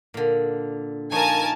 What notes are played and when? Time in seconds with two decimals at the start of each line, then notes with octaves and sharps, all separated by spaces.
0.14 A#2 D3
1.12 F3 D#4 A#4 C#5 G#5 A5